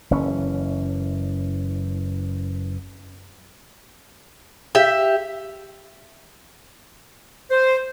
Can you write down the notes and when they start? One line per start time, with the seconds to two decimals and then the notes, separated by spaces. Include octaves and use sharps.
0.11 F#1 E3 C#4
4.75 G4 E5
7.51 C5